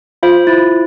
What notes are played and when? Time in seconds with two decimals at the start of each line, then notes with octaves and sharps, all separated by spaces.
0.23 F4 C5 F5
0.47 E4